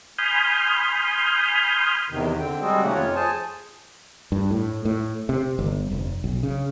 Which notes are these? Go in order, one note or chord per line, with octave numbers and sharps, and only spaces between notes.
G#5 B5 C6 D#6 F6 G6
E2 C3 D#3
D3 C4 G5
G3 G#3 C4 F#4 G#4 A4
C3 D#3 A3 A#3 C#4 F#5
F2 F4 C#5
G#4 C5 G#5 A5
G2
A2
A2
C3
G1
F1
B1
C#3